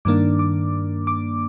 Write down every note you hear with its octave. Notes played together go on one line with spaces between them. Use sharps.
G2 D#3 A#3 D4 D6
D6
D6